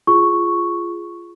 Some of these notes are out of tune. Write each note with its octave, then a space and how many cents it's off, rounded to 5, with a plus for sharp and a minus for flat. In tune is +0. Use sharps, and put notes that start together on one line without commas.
F4 -15 G#4 +0 C#6 +0